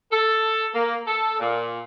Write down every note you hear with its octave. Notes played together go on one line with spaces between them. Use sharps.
A4
A#3
A4
A#2